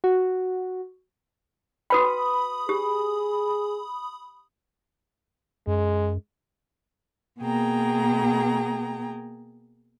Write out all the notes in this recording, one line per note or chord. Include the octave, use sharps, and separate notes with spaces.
F#4
F#4 B4 G5 B5 D#6
G4 G#4
F#2 G#3
B2 A#3 G#4 G5 A#5